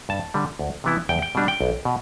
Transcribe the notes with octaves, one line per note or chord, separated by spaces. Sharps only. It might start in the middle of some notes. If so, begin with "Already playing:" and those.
G2 A5
D3 G3
D2
C3 E3 B3 E4
E2 G5
G5
B2 G3 D4
G5
B1
B2